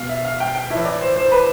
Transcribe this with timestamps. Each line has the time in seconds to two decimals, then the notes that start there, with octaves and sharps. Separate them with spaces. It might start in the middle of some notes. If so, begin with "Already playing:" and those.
Already playing: B2 F5
0.09 E5
0.25 F5
0.40 G5
0.55 G5
0.70 A2 E5
0.75 E3
0.85 D5
1.01 C5
1.16 C5
1.32 B4